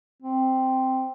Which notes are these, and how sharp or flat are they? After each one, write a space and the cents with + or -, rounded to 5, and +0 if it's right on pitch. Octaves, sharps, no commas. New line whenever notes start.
C4 +0